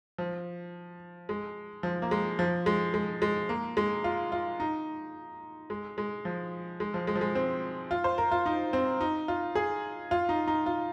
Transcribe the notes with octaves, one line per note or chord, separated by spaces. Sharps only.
F3
G#3
F3
A#3
G#3
F3
G#3
G#3
G#3
A#3
G#3
F4
F4
D#4
G#3
G#3
F3
G#3
F3
G#3
F3
G#3
C4
F4
C5
A#4
F4
D#4
C4
D#4
F4
G#4
F4
D#4
D#4
F4